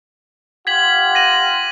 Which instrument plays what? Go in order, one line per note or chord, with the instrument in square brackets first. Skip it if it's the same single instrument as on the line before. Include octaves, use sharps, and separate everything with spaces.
[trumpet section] F4 G4 F#5 [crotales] G#6 B6 F#7
[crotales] A#6 D#7 F#7